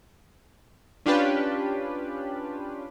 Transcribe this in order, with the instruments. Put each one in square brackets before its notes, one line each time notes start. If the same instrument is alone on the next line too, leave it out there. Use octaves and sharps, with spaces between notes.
[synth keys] C#4 D4 F4 G4 B4